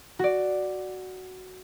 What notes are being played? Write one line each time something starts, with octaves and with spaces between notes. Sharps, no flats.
F#4 D5